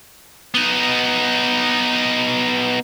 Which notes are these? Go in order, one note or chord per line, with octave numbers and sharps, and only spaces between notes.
B3 D#4